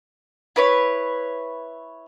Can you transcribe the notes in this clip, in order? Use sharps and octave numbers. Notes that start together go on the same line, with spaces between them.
E4 B4 C#5